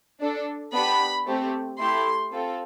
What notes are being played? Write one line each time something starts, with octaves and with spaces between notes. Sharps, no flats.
D4 A4
B3 D4 G4 B5
A3 C4 G4
A3 E4 G4 C6
C4 F4 A4